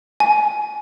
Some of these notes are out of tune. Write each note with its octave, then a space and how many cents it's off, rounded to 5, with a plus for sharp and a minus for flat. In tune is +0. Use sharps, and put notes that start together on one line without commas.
G#5 +25